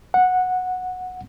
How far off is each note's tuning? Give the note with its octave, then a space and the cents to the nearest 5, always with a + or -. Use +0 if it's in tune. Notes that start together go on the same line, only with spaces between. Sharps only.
F#5 -10